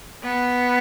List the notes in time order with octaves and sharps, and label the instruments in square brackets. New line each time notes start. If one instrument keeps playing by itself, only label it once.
[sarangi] B3